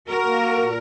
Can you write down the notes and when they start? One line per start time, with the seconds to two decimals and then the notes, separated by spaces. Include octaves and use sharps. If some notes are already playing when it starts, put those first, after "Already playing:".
0.08 F#4 A#4
0.25 A#3
0.42 F#4
0.57 A#2